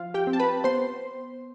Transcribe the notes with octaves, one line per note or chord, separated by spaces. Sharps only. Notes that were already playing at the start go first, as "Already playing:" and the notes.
Already playing: F3 F4 F5
G4 G5
C4
A5
B4 B5
B3 C5 C6